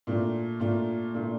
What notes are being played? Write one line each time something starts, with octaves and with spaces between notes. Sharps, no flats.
A#2 A3 D4 F4
A#2 A3 D4 F4
A#2 A3 D4 F4